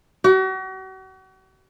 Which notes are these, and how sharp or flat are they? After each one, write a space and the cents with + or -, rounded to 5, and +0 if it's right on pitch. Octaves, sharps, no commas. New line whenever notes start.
F#4 +40